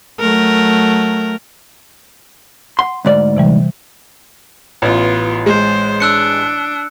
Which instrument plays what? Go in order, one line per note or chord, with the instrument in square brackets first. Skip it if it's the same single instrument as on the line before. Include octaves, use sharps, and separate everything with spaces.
[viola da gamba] F#3 A3 A#4
[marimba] F#5 [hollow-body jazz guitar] C6
[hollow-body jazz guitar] D2 G#2 D5
[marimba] C3 E3 G3
[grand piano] A1 [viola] B3 F4
[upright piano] G#3 [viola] C5
[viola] D4 [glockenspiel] E6 F#6 C#7